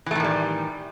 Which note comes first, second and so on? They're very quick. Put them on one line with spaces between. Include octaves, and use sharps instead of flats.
E3 A3 D#3 A2 G3